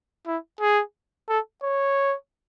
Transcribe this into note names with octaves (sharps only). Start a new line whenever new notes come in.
E4
G#4
A4
C#5